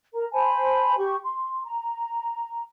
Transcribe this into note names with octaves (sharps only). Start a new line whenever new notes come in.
A#4 A#5
C5 G#5 A5 B5
G4 C#6
C6
A#5